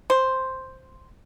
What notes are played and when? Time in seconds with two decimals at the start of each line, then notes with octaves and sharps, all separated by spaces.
0.10 C5